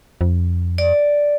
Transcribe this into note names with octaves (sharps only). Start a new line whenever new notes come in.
F2
D5